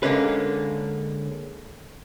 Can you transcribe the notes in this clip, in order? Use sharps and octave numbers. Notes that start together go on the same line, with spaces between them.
D3 G#3 A#3 C#4 B4